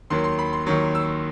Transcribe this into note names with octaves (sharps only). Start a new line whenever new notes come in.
D#2 D#3 F#3 C6
C6
B5
C6
D#2 D#3 F#3 C#6
E6